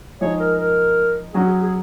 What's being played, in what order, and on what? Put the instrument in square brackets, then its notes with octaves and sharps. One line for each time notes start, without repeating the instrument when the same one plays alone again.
[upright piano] F3 G#3 D#4 G#4 [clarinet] C#5
[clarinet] A#4
A#4
[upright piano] F#3 C#4 F#4 [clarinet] G#4
[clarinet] G#4
G#4